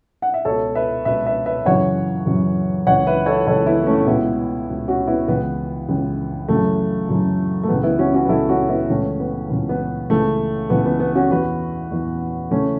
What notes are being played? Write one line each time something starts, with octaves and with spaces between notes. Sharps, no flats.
F#5
E5
C#2 B2 A4 C#5
B4 E5
C#2 B2 B4 E5
B4 E5
B4 E5
F#2 C#3 E3 C#5 F#5
F#2 C#3 E3
C#2 C#3 E3 C#5 F#5
B4 E5
A4 C#5
C#2 C#3 E3 A4 C#5
B3 E4
B3
A3 C#4
C#2 B2 B3 E4
C#2 B2
C#4 F#4
B3 E4
C#2 C#3 E3 B3
C#2 C#3 E3
F#2 C#3 E3 A3
F#2 C#3 E3
A3
C#2 C#3 E3 B3
B3 E4
C#4 F#4
C#4 F#4
B4
C#2 C#3 E3 E4 A4
C#4 F#4
B3 E4
C#2 C#3 E3 A3 C#4
B3
C#2 C#3 E3
B3
C#2 C#3 E3 A3
C#2 C#3 E3 B3
B3
B3
C#4 F#4
E2 E3 F#4 B4
E2 E3
C#3 E3 A3 C#4